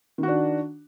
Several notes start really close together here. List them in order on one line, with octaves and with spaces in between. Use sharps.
D#3 F#4 D4